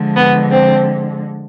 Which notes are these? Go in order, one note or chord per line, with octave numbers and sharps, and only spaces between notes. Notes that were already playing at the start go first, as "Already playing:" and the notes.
Already playing: D3 F3 G#3
B3
C4